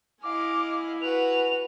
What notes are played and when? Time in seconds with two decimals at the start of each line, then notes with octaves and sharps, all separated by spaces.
0.23 E4 D#5 F5 G#5 D6
1.02 F#4 B4 F7